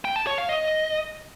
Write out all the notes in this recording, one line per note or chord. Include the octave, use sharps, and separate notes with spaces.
G5
A5
C#5
F5
D#5